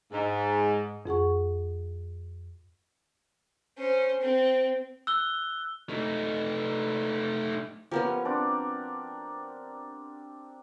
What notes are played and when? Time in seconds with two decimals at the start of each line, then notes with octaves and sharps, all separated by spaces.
0.12 G#2
1.06 F2 G#4 F#5 C#6
3.78 C#4 C5
4.21 C4
5.07 E6 F#6 G7
5.89 A3 D#4
7.91 F3 B3 C#4 G4 A#4 F#5
8.25 C4 D4 D6